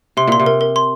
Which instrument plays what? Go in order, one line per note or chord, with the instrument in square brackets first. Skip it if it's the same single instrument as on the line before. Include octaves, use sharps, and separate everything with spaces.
[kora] C3 [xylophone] C6
[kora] A#2 [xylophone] C6
[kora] C3
[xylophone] A#4
A#4
C6